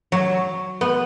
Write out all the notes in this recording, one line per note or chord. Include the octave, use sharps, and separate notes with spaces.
F#3
B3